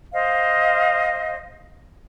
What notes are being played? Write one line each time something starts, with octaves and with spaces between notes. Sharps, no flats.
C5 D#5 F5